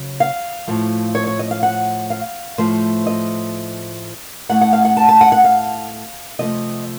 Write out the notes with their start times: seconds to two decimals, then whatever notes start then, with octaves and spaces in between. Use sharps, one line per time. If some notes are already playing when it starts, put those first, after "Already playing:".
Already playing: C#3 F#3
0.20 F5
0.68 A2 F3 A3
1.15 C#5
1.27 C#5
1.39 D#5
1.51 F5
1.63 F#5
2.10 F5
2.58 A2 F3 A3 C5
3.07 D#5
4.49 A2 A3 F#5
4.61 F#5
4.73 F5
4.85 F#5
4.97 A5
5.09 A5
5.21 F#5
5.32 F#5
5.44 F5
6.39 C3 F3 A3 D#5